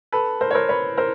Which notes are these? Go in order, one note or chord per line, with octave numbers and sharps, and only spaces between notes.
A4 B4
A#4 C5
C#5
A#4 C5
B4 C#5
A#4 C5